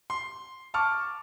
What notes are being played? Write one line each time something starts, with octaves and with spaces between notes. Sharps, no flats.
C6
A5 C#6 D6 F6